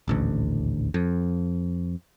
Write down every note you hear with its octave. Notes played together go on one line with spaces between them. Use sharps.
D#1 A1 D2
F2